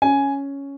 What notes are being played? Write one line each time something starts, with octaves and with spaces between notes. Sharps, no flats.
C#4 G#5